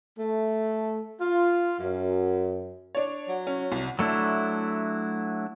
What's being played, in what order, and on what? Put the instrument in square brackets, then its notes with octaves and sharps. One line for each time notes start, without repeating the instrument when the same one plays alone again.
[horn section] A3
F4
F#2
[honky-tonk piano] D4 C#5
[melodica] F#3
[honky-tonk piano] C#4
C2
[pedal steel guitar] F#3 A3 D4 E4